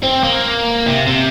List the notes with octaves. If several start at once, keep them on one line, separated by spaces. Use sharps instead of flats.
C4
A#3
C3
C3